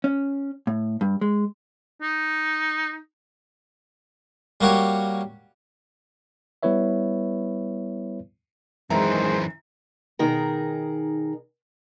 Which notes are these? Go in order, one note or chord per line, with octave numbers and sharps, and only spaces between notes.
C#4
A2
G2
G#3
D#4
G3 A#3 F#4 G4 C#5
G3 B3 E4 B4 C#5 E5
F#2 D#3 E3 G#3 G#4 C5 E5 A#5
B2 D#3 D#4 G#4 A#4